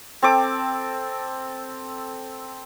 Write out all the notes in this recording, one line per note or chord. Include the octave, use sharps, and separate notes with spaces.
C4 A4 D6